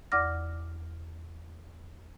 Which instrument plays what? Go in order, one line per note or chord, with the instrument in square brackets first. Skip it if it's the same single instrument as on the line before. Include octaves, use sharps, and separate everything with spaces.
[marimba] E2 D5 F#5 D6 F6 A#6